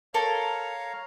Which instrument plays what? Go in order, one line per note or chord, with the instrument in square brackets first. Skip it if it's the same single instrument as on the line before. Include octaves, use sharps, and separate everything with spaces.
[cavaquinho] A4 A#4 [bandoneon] C#5 F5 A#5